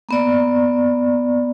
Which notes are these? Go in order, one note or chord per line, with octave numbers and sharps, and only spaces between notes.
A#3 B3 D5